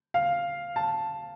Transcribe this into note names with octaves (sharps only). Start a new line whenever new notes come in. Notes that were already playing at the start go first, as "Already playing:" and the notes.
F5
A5